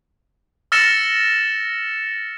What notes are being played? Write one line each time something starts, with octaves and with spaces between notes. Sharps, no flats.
E6 F6 A6 A#6 C#7 E7